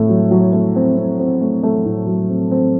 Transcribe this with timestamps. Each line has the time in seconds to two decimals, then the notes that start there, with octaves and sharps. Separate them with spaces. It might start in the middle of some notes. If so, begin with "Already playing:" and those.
Already playing: A2 A3 C4
0.09 F#3
0.31 F#3
0.53 A3
0.76 C4
0.97 C4
1.19 C4
1.41 A3
1.63 A3
1.85 A2
2.07 F#3
2.29 C4
2.51 C4